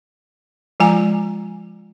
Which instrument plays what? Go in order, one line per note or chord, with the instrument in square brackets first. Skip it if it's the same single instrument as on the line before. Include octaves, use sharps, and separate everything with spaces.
[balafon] F3 G#3 F4 G#5 A#5